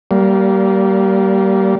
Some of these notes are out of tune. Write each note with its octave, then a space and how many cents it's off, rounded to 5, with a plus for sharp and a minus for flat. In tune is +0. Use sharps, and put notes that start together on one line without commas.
G3 -25 A#3 +0